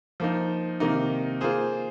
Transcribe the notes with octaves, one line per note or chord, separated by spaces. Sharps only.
F3 A#3 D#4
C3 D#3 A#3 D#4
A#3 F4 G#4 C5